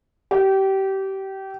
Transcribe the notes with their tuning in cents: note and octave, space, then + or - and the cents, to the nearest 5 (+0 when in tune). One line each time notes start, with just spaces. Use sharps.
G4 -25